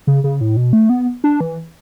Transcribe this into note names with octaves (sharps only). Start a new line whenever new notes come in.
C#3
C#3
A2
B2
A3
B3
D4
E3